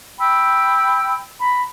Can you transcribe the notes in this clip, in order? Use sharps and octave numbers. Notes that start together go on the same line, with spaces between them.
G5 B5 E6
A#5 B5